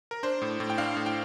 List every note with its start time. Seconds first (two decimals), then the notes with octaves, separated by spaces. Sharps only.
0.11 A#4
0.23 D4 C5
0.42 A2
0.60 A2
0.70 G5
0.78 D4 F5
0.97 A2
1.06 G5